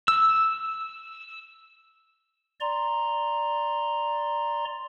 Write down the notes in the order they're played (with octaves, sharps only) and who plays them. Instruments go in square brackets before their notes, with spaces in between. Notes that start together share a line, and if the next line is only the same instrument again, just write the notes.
[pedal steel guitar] E6
[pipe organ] D5 A#5 C6